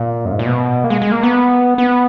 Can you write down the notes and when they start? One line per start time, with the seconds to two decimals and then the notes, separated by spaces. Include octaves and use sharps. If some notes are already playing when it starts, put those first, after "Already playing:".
Already playing: A#2
0.25 F#2
0.32 G#2
0.39 A#2
0.46 B2
0.84 A#3
0.90 G#3
1.02 G#3
1.12 A#3
1.23 B3
1.78 B3